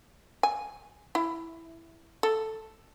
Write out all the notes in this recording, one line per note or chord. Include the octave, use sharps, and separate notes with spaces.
G#5
E4
A4